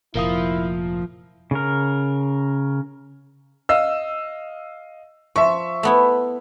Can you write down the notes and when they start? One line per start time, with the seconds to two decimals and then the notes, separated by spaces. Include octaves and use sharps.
0.15 F1 A#2 F3 E4 A#4 F5 D#6
1.51 C#3 A#4
3.69 D#5 F5 E6
5.36 F3 E5 C#6
5.83 A3 B3 E4